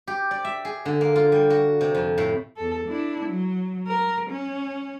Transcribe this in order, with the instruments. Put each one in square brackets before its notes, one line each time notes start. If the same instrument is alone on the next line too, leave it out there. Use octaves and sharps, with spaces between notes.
[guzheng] G4
D5
E5
G#4
D3
A#3
F4
G3
F#4
C3
F2
A2
[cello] E2 A4
D4 E4
F#3
A#4
C#4